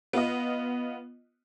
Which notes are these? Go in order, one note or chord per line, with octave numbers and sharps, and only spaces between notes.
B3 F4 D#5